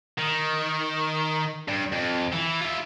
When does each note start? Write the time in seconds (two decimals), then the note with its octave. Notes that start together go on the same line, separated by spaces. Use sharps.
0.18 D#3
1.68 G2
1.92 F2
2.32 E3
2.61 F4 E5